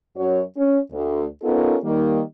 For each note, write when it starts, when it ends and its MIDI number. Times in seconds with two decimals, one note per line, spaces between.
0.17 0.41 42
0.17 0.41 66
0.17 0.41 73
0.57 0.78 61
0.92 1.25 38
1.43 1.76 59
1.43 1.76 61
1.43 1.76 63
1.43 1.76 65
1.43 1.76 69
1.43 1.76 70
1.84 2.21 51
1.84 2.21 55
1.84 2.21 58